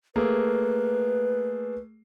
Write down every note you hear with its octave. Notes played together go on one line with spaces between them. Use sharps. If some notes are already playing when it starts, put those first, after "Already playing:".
A3 A#3 G#4 B4